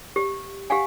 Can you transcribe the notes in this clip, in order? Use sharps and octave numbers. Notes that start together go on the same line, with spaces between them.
G4
G4 F5 F#5 G#5